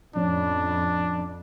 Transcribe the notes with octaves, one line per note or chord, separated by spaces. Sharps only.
F2 A2 F3 C#4 D4